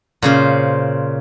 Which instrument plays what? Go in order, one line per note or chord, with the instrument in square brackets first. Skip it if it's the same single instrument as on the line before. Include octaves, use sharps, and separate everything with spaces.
[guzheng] A#2 C#3 C5